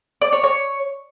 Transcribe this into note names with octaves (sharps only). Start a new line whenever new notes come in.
D5
C#5
C#5